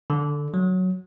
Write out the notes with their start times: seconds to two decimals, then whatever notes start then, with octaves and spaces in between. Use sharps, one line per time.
0.10 D3
0.54 F#3